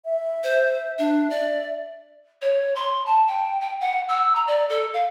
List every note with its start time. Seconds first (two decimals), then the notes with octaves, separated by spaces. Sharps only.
0.05 E5
0.43 C5
0.99 D4 E5
1.30 D5
2.41 C#5
2.75 C6
3.06 A5
3.27 G5
3.61 G5
3.80 F#5
4.08 E6
4.35 A#5
4.47 D5
4.69 A4
4.93 F5